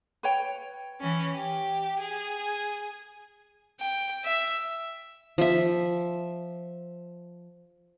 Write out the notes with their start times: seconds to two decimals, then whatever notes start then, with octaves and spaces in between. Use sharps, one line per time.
0.23 B4 C#5 G5
1.00 E3 C#4
1.35 G4
2.00 G#4
3.80 G5
4.25 E5
5.38 F3 E5